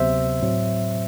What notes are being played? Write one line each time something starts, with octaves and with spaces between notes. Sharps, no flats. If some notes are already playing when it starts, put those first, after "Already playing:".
Already playing: D2 C3 F#3 B3 C5 E5
A2 F#3 C4